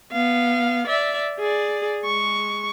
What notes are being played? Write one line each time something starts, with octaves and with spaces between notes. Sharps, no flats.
B3 F5
D5 E5
G#4 D5
G#3 C#6